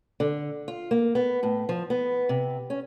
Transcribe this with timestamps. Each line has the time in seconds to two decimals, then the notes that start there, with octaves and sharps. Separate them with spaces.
0.20 D3
0.68 F4
0.91 A#3
1.15 B3
1.43 A2
1.69 F3
1.90 B3
2.29 C3
2.70 C#4